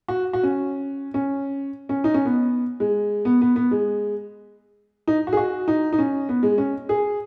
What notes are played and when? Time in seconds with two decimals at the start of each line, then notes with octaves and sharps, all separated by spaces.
0.08 F#4
0.33 F#4
0.43 C#4
1.14 C#4
1.89 C#4
2.04 D#4
2.14 C#4
2.25 B3
2.80 G#3
3.25 B3
3.41 B3
3.56 B3
3.71 G#3
5.07 D#4
5.27 F#4
5.33 G#4
5.37 F#4
5.68 D#4
5.93 D#4
5.99 C#4
6.29 B3
6.43 G#3
6.58 C#4
6.89 G#4